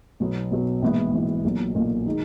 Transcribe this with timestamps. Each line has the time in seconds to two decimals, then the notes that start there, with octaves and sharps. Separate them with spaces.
0.20 B1 B2 F#3 B3
0.51 B1 B2 F#3 B3
0.82 A#1 G#2 E3 B3 E4
1.13 A#1 G#2 E3 B3 E4
1.44 B1 A#2 F#3
1.75 B1 A#2 F#3
2.06 D#3 G#3 D#4